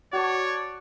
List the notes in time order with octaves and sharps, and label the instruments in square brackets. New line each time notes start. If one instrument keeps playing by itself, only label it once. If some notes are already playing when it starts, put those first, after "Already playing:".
[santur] F#4 A5 [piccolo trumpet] C#5 [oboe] D5